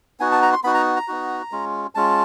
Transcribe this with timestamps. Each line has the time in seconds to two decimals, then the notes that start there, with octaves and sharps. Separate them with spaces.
0.20 B3 D#4 F#4 G#5
0.32 A5
0.42 A#5
0.53 C6
0.64 B3 D#4 F#4 B5
0.74 A#5
0.96 A#5
1.08 B3 D#4 F#4
1.52 G#3 C#4 F4
1.95 G#3 C#4 F4 A5